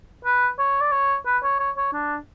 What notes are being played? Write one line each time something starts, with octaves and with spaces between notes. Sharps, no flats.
B4
C#5
D5
C#5
B4
C#5
C#5
C#5
D4